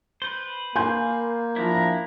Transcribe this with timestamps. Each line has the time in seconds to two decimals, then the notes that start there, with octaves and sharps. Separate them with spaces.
0.22 B4 C5
0.76 A#3 G#5 C6 G6
1.56 F3 D4 E4 A#5